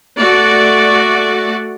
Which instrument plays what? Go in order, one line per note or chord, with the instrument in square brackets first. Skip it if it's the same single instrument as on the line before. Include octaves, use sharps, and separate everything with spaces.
[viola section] A3 F#4 D5